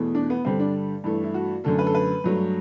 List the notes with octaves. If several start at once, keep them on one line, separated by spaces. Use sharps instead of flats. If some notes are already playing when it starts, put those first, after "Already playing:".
Already playing: E2 B2 A3
D4
B3
G2 D3 G3 C4
D4
G2 E3 A3
E4
F#4
F#2 D3 A3 A4
B4
A4
B4
G2 F#3 A3